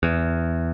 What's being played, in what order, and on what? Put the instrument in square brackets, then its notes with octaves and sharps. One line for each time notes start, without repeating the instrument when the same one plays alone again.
[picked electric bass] E2